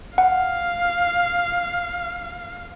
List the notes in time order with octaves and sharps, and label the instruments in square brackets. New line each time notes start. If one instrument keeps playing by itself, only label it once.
[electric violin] F5 [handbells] F#5